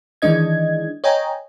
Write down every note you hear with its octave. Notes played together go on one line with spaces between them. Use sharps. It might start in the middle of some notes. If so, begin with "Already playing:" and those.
D#3 E3 G#3 D4 D#5 G#6
C#5 D#5 G5 G#5 A#5